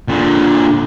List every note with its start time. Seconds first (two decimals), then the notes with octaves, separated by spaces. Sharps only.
0.08 A#2 D3